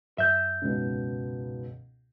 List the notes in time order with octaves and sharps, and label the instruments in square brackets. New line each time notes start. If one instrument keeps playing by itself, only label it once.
[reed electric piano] F#2 G6 [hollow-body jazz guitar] E5
[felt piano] C#2 G#2 B2